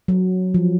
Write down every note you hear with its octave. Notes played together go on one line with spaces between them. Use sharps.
F#3
F3